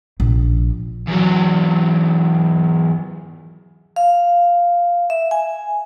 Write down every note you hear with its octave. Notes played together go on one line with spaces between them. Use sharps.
A#1
E2 F#3
F5
E5
G#5